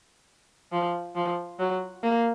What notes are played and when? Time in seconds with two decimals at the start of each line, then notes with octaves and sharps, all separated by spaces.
0.72 F3
1.15 F3
1.59 F#3
2.03 A#3